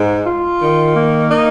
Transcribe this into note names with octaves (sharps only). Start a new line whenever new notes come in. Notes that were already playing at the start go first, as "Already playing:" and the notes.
Already playing: G#2
F4
D#3
A#3
D#4